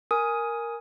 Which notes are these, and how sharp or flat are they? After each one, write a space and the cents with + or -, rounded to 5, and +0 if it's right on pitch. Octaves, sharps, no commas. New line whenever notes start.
A#4 +0 G#5 +0 D#6 +10